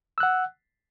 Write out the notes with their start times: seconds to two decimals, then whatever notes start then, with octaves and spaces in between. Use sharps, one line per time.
0.18 E6
0.20 F#6
0.23 F#5